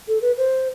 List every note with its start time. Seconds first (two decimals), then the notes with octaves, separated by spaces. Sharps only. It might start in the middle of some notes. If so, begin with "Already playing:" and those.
0.08 A4
0.22 B4
0.37 C5